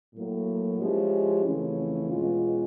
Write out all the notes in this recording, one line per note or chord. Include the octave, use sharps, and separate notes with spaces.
A2 F#3 A#3
F3 G#3 C#4 E4 G4
F2 C#3 E3 A3 C#4
E2 B2 G#3 C#4 F4